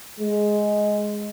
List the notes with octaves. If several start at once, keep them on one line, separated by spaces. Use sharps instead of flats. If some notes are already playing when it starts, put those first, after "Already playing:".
G#3